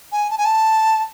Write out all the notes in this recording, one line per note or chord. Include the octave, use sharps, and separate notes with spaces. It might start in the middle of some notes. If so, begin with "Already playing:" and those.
G#5
A5
G#5
A5